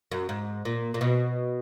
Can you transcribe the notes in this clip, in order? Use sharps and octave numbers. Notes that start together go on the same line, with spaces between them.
F#2
G#2
A#2
A#2
B2